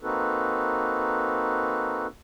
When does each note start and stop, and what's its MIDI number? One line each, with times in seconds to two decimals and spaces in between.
0.02 2.07 58
0.02 2.07 60
0.02 2.07 63
0.02 2.07 66
0.02 2.07 69
0.02 2.07 71